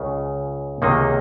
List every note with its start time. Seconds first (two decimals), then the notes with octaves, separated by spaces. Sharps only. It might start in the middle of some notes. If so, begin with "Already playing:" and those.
Already playing: C#2 C#3
0.82 C#2 C3 D#3 A#3 D#4